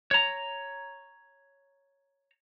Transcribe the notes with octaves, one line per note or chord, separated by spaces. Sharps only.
C#5 A#5